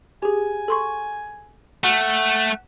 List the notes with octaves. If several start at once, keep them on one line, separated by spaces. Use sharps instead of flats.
G4 G#4 G#5
A4 C6 C#6
A3 F#5